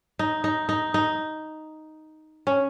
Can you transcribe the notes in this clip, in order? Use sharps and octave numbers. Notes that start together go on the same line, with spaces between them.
D#4
D#4
D#4
D#4
C#4